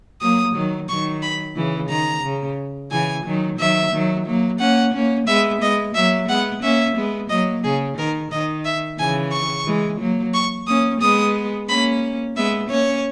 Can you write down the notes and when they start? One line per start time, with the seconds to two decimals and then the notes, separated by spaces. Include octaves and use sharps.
0.21 F#3 A#3 D#6
0.55 D#3 F#3
0.89 D#3 F#3 C#6
1.22 B5
1.56 C#3 E3
1.90 D#3 A#5
2.24 C#3
2.91 C#3 E3 G#5
3.25 D#3 F#3
3.58 D#3 F#3 E5
3.92 D#3 F#3
4.26 F#3 A#3
4.60 A#3 C#4 F#5
4.94 A#3 C#4
5.27 G#3 B3 E5
5.61 G#3 B3 D#5
5.95 F#3 A#3 E5
6.29 G#3 B3 F#5
6.62 A#3 C#4 E5
6.96 G#3 B3
7.29 F#3 A#3 D#5
7.64 C#3 G#4
7.97 D#3 A#4
8.31 D#3 D#5
8.65 E5
8.99 C#3 E3 G#5
9.32 C#6
9.66 E3 G#3
10.00 F#3 A#3
10.34 C#6
10.67 A#3 C#4 D#6
11.01 G#3 B3 D#6
11.69 A#3 C#4 B5
12.37 G#3 B3 E5
12.69 A#3 C#4 C#5